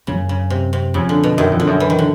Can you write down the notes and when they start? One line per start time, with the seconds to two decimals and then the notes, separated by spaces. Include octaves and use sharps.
0.07 F#2 C#3
0.29 C#3
0.50 C3
0.73 C3
0.94 F2 C#3
1.09 D3
1.23 B2
1.37 F#2 D#3
1.51 F2
1.60 D3
1.67 F#2
1.80 E3
1.90 D#3
1.99 D3